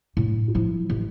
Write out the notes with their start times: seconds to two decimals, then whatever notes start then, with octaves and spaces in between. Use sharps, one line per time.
0.17 A2
0.55 F3 E4
0.90 A1